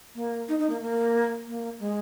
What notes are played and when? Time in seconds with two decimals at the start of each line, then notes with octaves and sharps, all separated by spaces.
0.15 A#3
0.48 D#4
0.59 D#4
0.70 A#3
0.81 A#3
1.47 A#3
1.79 G#3